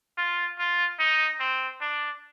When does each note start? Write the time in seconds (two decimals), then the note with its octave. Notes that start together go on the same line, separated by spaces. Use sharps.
0.18 F4
0.59 F4
0.99 D#4
1.40 C4
1.81 D4